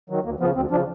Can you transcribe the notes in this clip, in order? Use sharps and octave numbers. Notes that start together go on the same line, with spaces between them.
D#3 F#3
D2 A#3
C#3 F3 B3
D2 C4
C#3 F3 D4